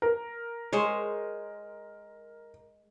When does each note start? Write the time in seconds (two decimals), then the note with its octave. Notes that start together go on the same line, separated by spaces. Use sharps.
0.02 A#4
0.73 G#3 C5 C#5